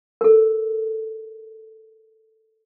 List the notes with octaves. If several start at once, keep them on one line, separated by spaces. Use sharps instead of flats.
A4 A#4